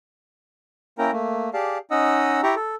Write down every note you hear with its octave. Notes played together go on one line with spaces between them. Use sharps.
A#3 C#4 E4 A#4 G5 A#5
A3 A#3
G4 G#4 D5 F5 A5
C#4 D#4 D#5 F#5 D#6 E6
E4 G4 G5 A#5 C#6
A4